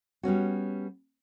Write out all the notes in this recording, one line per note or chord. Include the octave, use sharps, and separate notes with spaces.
G3 B3 C#4 F#4